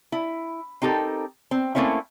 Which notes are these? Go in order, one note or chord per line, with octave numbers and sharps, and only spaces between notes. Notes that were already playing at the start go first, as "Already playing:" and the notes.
E4
C4 D#4 G4 A4 A#4
C4
A3 A#3 C4 C#4 E4